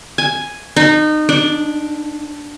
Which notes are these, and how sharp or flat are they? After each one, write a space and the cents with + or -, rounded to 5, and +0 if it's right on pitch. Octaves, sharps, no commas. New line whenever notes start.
G#5 +0
D#4 -25
D4 +0